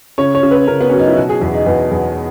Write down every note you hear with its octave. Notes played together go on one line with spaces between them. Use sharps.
C#3 C#5
C#5
C#3
B4
C#3 A#4
B3
F#3 C#4
D#4
E4
B2 F#4
G#4
E2 F#4
D#4
E2 B3
E2